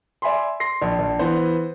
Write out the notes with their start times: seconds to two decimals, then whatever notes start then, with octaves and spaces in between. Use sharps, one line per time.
0.22 D5 E5 G#5 B5 C6
0.60 C6 A#6 C7
0.82 A#1
0.99 A#1
1.19 E3 B3 C5